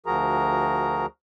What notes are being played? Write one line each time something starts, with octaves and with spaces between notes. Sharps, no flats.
D2 F3 F#4 G#4 A#4 A#5